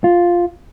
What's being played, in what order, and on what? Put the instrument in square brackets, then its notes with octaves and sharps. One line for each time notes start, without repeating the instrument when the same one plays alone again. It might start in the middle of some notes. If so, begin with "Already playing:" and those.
[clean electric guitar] F4